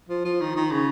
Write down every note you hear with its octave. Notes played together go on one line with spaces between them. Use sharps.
F3
F3
D#3
D#3
C#3